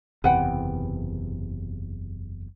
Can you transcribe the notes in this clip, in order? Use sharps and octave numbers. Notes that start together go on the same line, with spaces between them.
F#1 E2 C3 B4 F#5 G5